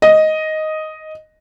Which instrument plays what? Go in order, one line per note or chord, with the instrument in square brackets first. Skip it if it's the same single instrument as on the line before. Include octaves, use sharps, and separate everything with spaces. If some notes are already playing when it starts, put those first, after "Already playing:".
[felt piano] D#5